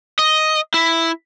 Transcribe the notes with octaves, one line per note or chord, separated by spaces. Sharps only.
D#5
E4